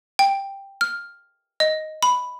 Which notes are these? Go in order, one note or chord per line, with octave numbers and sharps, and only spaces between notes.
G5
F6
D#5
B5